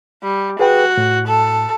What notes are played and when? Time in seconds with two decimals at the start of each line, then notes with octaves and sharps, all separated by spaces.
0.23 G3
0.59 F#4 G#4 B4 G5
0.97 A2
1.27 A4